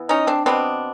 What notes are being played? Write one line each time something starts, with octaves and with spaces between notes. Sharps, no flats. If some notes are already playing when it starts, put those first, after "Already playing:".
Already playing: E3 B3
C#4 D#4
C4 D4
B2 G3 B3 C4 D4